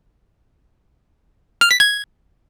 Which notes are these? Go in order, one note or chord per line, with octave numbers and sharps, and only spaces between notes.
F6
B6
G#6